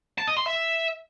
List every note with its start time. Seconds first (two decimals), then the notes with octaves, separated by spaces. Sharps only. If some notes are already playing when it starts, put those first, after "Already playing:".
0.18 A5
0.27 D#5
0.37 C6
0.46 E5